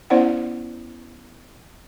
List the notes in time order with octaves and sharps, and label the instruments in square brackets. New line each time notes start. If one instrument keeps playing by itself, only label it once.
[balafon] B3 C#4 E4 C5 D5 F#5